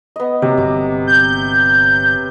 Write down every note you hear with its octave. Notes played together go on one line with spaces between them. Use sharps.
B3 D#5
C3 F#3
G1 D6
G6